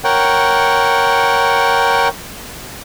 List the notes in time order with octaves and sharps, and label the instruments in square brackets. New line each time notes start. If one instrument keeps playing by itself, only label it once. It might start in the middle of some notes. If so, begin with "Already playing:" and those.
[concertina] A#4 C#5 F#5 G5